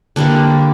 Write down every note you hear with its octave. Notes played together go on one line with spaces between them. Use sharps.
D3 G3 A#3 D4